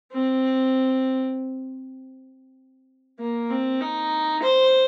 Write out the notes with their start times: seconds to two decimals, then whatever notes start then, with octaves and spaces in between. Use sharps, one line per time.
0.12 C4
3.19 A#3
3.50 C4
3.81 D#4
4.42 C5